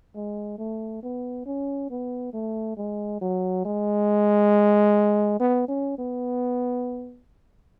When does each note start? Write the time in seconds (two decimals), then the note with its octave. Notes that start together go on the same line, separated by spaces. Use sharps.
0.15 G#3
0.59 A3
1.03 B3
1.46 C#4
1.91 B3
2.34 A3
2.77 G#3
3.21 F#3
3.65 G#3
5.40 B3
5.69 C#4
5.98 B3